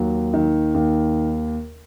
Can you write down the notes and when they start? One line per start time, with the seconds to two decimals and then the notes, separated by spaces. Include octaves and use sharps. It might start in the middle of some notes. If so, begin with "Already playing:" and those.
Already playing: D#2 F#3
0.34 D#3
0.74 D#2